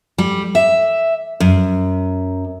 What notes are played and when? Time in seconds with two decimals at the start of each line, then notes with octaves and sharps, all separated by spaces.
0.18 G3
0.55 E5
1.40 F#2